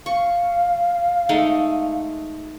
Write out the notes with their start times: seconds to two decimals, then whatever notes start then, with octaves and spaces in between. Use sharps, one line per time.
0.06 F5 C#6
1.29 G#3 A3 D#4